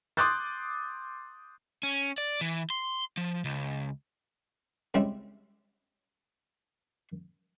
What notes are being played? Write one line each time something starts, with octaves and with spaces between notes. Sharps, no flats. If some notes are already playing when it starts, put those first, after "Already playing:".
C6 D6 D#6 F#6 G6 A6
C#4
D5
E3
C6
F3
C#2
C#3 G3 G#3 C4 E4